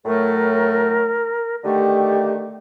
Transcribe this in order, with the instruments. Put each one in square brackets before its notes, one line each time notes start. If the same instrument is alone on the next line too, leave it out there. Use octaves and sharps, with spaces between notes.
[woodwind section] A2 F#3 A3 [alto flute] A#4
[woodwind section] D3 D#3 A3 [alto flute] G4